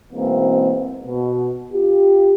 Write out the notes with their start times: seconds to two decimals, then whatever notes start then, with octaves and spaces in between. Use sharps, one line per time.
0.12 G#2 B2 E3 A#3 C4
1.06 B2
1.72 F4 G4